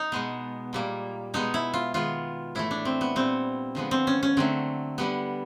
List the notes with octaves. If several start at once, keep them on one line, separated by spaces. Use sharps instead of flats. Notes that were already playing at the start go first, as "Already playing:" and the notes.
Already playing: D#4
B2 G#3 B3
A#2 G3 A#3
B2 G#3 B3 D#4
E4
F4
D#3 G#3 B3 F4
A2 E3 A3 E4
D4
C4
B3
A#2 G3 B3 C4
D3 F3 G#3 B3
C4
C#4
C#4
D3 F#3 A3 C4
D3 G3 B3